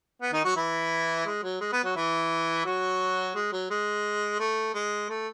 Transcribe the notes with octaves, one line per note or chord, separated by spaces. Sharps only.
B3
D#3 D#4
F#3 F#4
E3 E4
G#3
F#3
G#3
B3
F#3 F#4
E3 E4
F#3 F#4
G#3
F#3
G#3
A3
G#3
A3